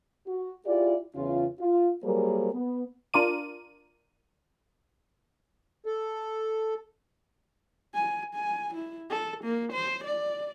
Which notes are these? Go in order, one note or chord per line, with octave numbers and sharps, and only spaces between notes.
F#4
E4 F4 G4 G#4 D5
E2 C#3 C#4 F4
F4
F#3 G3 A#3 G#4 A#4 C5
B3
D4 F4 A#4 D5 D#7
A4
G#5
G#5
E4
A4
A#3
C5
D5